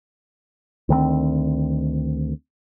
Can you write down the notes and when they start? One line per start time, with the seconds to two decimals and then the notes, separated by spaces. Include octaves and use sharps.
0.89 D2 D#3 G#3 C4